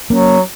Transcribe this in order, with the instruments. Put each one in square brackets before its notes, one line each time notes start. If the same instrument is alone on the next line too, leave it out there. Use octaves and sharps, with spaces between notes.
[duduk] F#3 [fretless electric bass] A#3 C#4